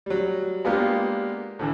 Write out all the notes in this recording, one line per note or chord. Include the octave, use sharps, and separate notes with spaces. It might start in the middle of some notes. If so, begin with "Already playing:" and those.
F#3 G3
G#3 A#3 B3 D4 F4 G4
A2 D3 E3